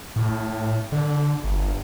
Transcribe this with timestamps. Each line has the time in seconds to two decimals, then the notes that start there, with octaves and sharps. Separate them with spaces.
0.16 A2
0.92 D3
1.44 G1